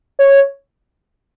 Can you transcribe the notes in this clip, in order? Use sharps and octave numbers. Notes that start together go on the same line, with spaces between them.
C#5